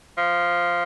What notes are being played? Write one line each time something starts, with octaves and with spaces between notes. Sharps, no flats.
F3